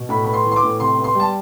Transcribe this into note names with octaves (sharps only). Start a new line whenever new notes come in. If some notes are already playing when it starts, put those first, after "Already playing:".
Already playing: B2
A2 B5
B3 B5
C6
E3
C6
D6
A2
C3 C6
B3
C6
G3 A5